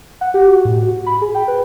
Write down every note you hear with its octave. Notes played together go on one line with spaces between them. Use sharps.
F#5
G4
F#4
A2
F#4
B5
G#4
G5
B4